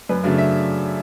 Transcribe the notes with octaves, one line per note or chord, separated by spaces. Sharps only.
F#2 B4
C#3 F#3 A3 D4 D5
E5